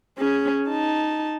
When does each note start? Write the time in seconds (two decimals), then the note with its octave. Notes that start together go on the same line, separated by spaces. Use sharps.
0.18 C#4 G#4
0.68 D#4 A5